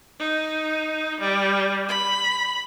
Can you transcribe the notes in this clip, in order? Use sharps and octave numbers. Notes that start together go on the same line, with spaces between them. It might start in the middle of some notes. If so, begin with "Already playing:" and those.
D#4
G3
B5